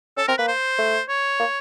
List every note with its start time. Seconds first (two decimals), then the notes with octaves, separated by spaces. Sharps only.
0.17 C#4 A4
0.28 C4 A#4
0.38 A#3 B4
0.48 C5
0.78 A3
1.09 C#5
1.39 A#3